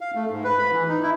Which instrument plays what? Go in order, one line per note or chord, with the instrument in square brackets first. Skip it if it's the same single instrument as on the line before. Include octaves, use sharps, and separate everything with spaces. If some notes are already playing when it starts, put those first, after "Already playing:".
[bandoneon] F5
A3
G#2
B4
B5
E3
D#4
E4